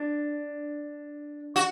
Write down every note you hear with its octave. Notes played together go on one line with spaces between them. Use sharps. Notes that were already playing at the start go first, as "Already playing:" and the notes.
Already playing: D4
F#4